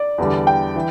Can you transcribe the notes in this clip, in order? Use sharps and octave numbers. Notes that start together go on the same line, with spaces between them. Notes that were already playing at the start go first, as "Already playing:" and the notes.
Already playing: D5
E2 D3 G3
G5
E3